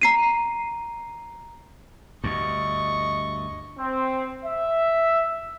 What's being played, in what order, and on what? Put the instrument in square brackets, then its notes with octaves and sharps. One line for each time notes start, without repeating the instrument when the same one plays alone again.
[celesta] A#5 C7 D#7
[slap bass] D2 G2 [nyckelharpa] D#5 C#6
[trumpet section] C4
E5